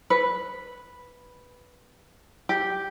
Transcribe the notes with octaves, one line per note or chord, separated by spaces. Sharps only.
B4
G4